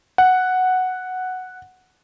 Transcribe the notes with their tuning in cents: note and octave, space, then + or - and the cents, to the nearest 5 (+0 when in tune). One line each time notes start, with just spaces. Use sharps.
F#5 +0